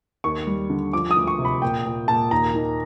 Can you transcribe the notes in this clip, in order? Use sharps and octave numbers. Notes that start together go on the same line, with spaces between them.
D#2 C#6
G3
D3
F3 D6
D#6
D2
C#6
C3
B5
A#2 G5
A#2
A#2 A5
D#2 A#5
D#3